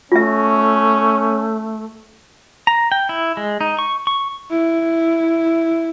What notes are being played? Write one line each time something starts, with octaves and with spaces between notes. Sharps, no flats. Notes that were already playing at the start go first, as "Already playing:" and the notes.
A3 C#4 F4 E5
A#5
G5
E4
G#3
D#4
C#6
C#6
E4